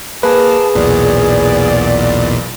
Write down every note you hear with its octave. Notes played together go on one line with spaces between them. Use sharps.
A#3 G#4 B4 A5
B1 E2 A#2 D5